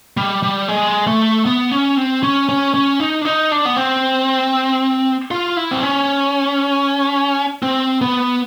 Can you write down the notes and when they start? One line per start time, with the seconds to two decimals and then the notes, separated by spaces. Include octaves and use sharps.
0.17 G3
0.43 G3
0.68 G#3
1.07 A3
1.46 B3
1.71 C#4
1.97 C4
2.23 C#4
2.49 C#4
2.74 C#4
3.00 D#4
3.21 D4
3.25 D#4
3.52 D4
3.65 B3
3.77 C4
5.31 F4
5.57 E4
5.71 C4
5.83 C#4
7.63 C4
8.01 B3